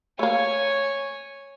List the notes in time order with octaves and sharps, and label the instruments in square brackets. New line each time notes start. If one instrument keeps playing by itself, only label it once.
[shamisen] A3 A#3 [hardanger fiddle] C#5 G#5